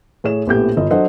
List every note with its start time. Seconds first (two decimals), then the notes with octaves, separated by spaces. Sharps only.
0.24 A2 G#4 C#5 E7
0.47 A#1 A2 B3 G4 A4 G6
0.77 G1 F4 D#5
0.91 F#3 D4 A4 C5 D#5 F#5